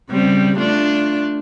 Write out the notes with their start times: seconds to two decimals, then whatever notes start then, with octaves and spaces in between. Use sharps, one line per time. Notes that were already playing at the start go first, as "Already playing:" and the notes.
0.10 C#3 G3 C4
0.58 A3 D4 F4